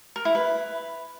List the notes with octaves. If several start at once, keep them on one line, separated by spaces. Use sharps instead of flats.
A#4
E4
B4